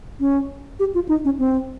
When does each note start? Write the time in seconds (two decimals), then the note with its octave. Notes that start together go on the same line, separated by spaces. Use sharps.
0.20 C#4
0.80 G4
0.95 F4
1.09 D#4
1.25 C#4
1.39 C4